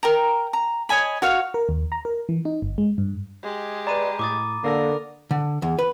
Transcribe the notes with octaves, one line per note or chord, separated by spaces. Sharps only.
A#4 G5 A#5
A#5
C#5 D#5 G#5 B5
F#4 C#5 F5
A#4
D#2
A#5
A#4
E3
D#4
G1
G#3
G2
G#3 G4
B4 D5 A#5 B5 D#7
A2 D6 D#6 A6
D3 A#3 A4 A#4 A#6
D3
E2
B4